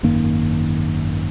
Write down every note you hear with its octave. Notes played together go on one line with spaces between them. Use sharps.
G#1 F#2 D#3 A#3